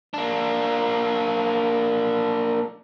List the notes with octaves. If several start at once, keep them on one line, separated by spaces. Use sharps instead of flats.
A#3 D4